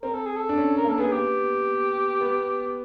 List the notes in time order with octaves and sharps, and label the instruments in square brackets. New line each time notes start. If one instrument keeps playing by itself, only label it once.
[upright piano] C4 [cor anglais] A#4
[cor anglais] A4
G#4
A4
[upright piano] D4
C#4
[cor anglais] A#4
[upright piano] A#3 [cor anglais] A4
[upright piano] B3 [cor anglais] G#4
[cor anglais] G4
[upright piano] B3